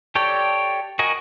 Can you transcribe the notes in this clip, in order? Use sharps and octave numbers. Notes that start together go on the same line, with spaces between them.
G4 A4 C#5 D5 G5
F#4 A#4 D#5 G#5